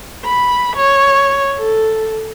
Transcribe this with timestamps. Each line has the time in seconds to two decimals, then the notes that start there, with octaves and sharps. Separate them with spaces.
0.25 B5
0.76 C#5
1.60 A4